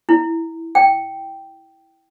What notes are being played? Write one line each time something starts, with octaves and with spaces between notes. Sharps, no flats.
E4
G5